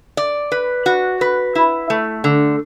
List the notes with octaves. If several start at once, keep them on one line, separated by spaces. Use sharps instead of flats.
D5
B4
F#4
B4
E4
A3
D3